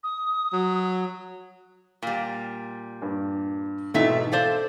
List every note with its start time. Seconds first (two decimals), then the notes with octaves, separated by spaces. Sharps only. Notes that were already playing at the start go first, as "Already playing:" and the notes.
0.04 D#6
0.53 F#3
2.02 A#2 G3
3.02 G2
3.94 E2 G#2 B2 A3 C4 E5
4.32 A4 C5 D5 F5